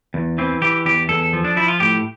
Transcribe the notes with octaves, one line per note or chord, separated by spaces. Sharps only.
E2
E3 C4
E3 G4
E2 G4
E2 A4
F3
D4
F3 E4
F4
A2 G4